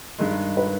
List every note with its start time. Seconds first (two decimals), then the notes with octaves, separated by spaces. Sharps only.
0.18 G2 D#3 G#3
0.57 B4